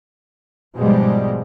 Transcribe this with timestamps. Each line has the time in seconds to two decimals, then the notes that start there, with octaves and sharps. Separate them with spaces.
0.76 G#2 B2 F3 G3 G#3